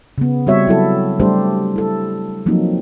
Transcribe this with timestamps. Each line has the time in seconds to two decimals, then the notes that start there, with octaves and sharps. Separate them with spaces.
0.18 C#3 B3
0.47 G3 C4 F#4 C#5 E5
0.67 F#3 E4 A4
1.20 G3 A3 D4 G4 A4 C5
1.76 E4 A4
2.46 F3 F#3 A#3 C4 D#4